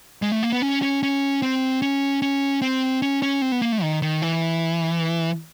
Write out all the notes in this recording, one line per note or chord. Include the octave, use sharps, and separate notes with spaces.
G#3
A3
A#3
B3
C#4
C#4
C#4
C4
C#4
C#4
C4
C#4
C#4
C4
B3
A#3
A3
D#3
D#3
E3